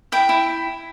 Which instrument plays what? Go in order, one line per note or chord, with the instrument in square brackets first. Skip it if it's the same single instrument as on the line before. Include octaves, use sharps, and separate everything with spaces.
[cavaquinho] E4 G5
E4